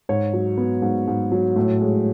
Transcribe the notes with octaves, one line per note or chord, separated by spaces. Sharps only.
G#2 C#5
F#3
B3
G#2
G#2
F#3
A2
G#3